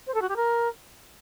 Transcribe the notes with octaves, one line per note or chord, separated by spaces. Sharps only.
C5
A4
F#4
G4
A#4